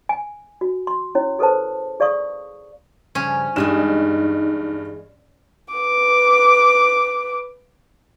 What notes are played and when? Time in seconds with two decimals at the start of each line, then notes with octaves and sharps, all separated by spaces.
0.09 G#5
0.61 F#4
0.87 C6
1.15 C#4 E4 C#5
1.39 G#4 A4 B4 C5 A5
2.00 G#4 D5 F5 C#6 D#6
3.15 G2 C#3 F3 C#4
3.56 E2 G2 G#3 D#4 G#4 E7
5.74 B4 D6